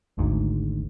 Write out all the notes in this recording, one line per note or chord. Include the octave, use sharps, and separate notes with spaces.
G#1 D2 G#2